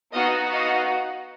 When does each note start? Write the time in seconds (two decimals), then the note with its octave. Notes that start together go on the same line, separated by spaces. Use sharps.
0.12 B3 D#4 F#4 D#5 F5
0.52 D#5 F5